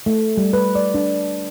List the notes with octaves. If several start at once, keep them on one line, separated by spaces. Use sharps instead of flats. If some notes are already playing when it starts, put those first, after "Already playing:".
A3
G3
B4
D5
D4